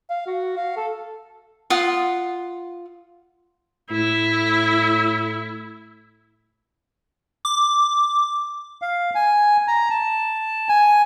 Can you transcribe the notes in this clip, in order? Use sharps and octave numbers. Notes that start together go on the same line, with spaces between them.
F5
F#4
F5
A4
F4 F#5 D#6
A2 E4
D6
F5
G#5
A#5
A5
G#5